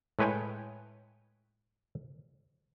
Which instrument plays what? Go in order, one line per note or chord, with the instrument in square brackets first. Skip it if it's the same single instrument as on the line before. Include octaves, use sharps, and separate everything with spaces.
[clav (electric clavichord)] A2 G#3 B4 C#5 G5 G#5